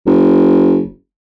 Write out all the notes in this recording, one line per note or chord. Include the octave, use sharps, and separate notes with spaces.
F#1